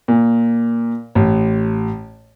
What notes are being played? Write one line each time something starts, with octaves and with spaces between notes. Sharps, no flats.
A#2
A1